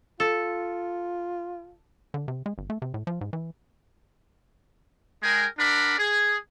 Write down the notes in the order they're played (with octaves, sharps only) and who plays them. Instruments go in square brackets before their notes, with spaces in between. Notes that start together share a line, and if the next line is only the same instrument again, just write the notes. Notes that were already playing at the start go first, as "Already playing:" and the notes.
[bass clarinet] F4 [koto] A4
[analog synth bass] D3
C3
G#3
G1
A3
C3
A2
F3
G#2
E3
[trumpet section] G#3 G#4 A#4 G5 G#5
D4 A#4 D5 F#5 B5
G#4